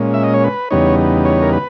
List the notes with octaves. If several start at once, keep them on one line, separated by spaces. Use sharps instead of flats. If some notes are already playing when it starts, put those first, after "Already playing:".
Already playing: A#2 G#3 C#4
E5
D#5
C#5
B4
E2 C#3 G3 B3 D#4 C#5
C#5
A#4
B4